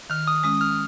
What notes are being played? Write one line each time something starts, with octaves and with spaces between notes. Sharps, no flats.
D#3 F6
D#6
G#3 C#4 D#6
F6